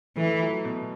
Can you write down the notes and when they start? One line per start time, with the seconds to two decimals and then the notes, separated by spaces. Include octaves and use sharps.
0.17 E3 A3
0.42 F#3
0.65 B2